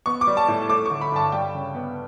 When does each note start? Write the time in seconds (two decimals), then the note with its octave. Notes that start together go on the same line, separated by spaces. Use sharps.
0.06 B3 C#6
0.21 D6
0.27 G3
0.37 A5
0.48 A2
0.69 A3 D6
0.86 D3 C#6
1.01 B5
1.12 G2 A5
1.32 G3 G5
1.54 C#3
1.75 B3